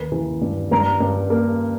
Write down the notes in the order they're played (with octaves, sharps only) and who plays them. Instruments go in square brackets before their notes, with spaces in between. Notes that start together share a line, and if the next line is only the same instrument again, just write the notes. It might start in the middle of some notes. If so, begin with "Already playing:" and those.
Already playing: [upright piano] D#2 A#3 [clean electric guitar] B4
[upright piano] E3
G2
[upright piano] G2 [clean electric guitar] A#4
[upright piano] G2
A#3